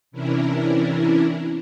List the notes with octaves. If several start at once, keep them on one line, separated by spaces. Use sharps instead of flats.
C3 E3 C#4 D4 E4 A#4